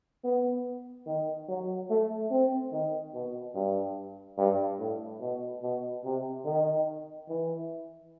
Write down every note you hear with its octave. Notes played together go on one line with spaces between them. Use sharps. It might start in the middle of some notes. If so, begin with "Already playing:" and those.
B3
D#3
F#3
A3
C4
D#3
B2
G2
G2
A2
B2
B2
C3
D#3
E3